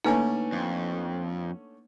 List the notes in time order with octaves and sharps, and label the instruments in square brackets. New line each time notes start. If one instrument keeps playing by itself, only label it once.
[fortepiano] D3 A3 C#4 [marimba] A#3 [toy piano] D#4 B4 G#5
[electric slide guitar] F2